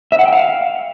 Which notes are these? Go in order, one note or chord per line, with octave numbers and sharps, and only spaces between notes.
E5
F#5
G5
F5